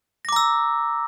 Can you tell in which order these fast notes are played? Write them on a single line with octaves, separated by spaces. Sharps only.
A#6 D6 A#5 E6